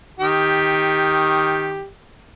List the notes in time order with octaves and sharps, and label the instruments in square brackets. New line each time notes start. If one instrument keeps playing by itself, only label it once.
[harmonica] D#3 G4